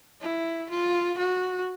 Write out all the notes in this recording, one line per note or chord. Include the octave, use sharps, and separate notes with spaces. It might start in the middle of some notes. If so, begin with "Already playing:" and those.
E4
F4
F#4